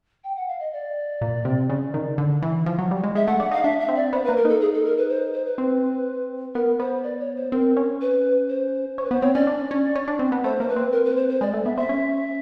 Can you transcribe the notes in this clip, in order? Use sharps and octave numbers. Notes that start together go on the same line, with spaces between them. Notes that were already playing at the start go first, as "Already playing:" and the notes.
G5
F#5
F5
D#5
D5
A#2
C3
C#3
D#3
D3
E3
F3
F#3
G3
G#3
G#3 E5
A3 F#5
D4 F#5
D#4 F5
D4 E5
E5
C4
D5
B3 C5
B4
A#3
A#4
D#4 A4
G#4
A4
A#4
B4
C5
C5
B4
C4
B3 A#4
B3 C5
D5
C#5
C5
C4 A#4
C#4
B4
C5
C#4 C5
B4
B3 C5
C4 C#5
C#4 D5
D4
C#4
C#4
D4
C4
B3
A3 C5
A#3 C5
B4
C4
A#4
B4
C5
C5
G#3 D5
A3
B3 E5
C4 E5
C#4